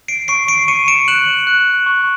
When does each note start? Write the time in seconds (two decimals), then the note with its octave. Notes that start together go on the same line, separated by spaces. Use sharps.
0.08 C7 D7
0.28 C#6 C7 D7
0.48 C7 D7
0.68 C#6 C#7 D#7
0.88 D7 E7
1.08 F#6 E7 F#7
1.47 F#6
1.86 C#6